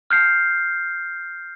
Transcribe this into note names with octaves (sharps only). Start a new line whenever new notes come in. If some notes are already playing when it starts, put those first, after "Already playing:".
F6 G6 C7